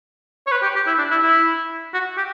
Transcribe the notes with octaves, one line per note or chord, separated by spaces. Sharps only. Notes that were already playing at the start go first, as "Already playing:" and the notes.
C#5
B4
G4
G4
E4
D4
E4
E4
F#4
G4